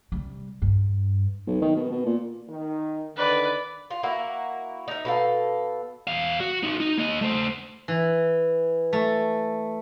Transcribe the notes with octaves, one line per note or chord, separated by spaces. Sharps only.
C3 G3
G2
B1
D#3
B2
B2
A#2
D#3
D3 D#3 B4 D5
F4
A#3 E4 F#4
D#4 E5
B2 A4 F5
E2 F5
F#4
D#4 F#4
D#4
A#3 D#5
A3 C5
E3
A3